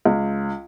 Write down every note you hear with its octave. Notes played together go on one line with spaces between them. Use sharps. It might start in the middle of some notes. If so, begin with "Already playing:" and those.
C#2